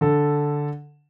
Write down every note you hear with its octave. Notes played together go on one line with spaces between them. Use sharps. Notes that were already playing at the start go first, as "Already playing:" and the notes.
D3 A4